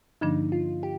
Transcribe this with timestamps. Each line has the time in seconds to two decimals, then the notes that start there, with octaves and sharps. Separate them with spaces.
0.21 G2 D3 F3 A#3 D4 D#4
0.52 F4
0.83 G4